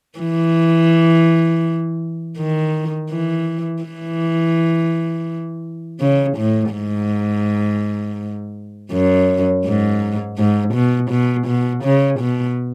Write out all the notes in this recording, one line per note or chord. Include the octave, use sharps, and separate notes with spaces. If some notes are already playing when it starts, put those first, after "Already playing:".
E3
D#3
E3
E3
C#3
A2
G#2
F#2
G#2
G#2
B2
B2
B2
C#3
B2